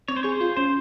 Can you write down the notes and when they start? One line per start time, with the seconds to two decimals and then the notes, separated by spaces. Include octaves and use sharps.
0.08 C4 C#5
0.16 C5
0.23 G#4 C#5
0.32 C5
0.41 F4
0.57 C#4 C5